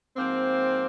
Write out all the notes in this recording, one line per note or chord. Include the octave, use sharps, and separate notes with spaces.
G#2 F3 A#3 C4